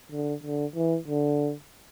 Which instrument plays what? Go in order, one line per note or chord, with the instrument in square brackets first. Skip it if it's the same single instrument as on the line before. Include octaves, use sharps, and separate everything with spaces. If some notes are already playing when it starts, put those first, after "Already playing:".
[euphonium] D3
D3
E3
D3